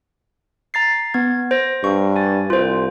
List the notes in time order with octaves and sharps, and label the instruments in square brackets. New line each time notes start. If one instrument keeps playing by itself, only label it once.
[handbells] A#5 A6 C7
B3 G#6
C5 A#6
[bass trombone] G2 [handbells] C#6
[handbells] G#5 A6
[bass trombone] C2 [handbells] F4 C5